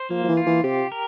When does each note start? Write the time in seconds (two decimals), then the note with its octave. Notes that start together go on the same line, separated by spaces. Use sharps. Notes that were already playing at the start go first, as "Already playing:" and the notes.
Already playing: C5
0.10 F3 A#3
0.24 F3
0.28 E3
0.37 F4
0.47 E3
0.64 C3 G4
0.92 A#4